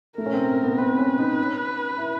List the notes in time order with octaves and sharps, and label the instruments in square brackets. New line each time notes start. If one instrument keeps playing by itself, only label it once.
[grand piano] A3 [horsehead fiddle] A#4
[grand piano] C#4
C4
B3
[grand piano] C4 [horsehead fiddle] B4
[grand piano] C#4
D#4
E4